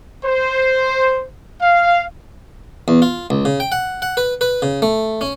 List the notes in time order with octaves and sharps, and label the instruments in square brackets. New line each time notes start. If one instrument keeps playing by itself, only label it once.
[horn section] C5
F5
[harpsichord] E2
F4
C#2
C#3
G5
F#5
F#5
B4
B4
C#3
A3
C#4